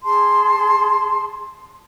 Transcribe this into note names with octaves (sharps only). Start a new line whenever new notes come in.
G#4 A5 C6